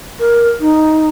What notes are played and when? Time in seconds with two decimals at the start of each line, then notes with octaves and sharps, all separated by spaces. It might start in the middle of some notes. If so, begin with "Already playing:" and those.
0.20 A#4
0.60 D#4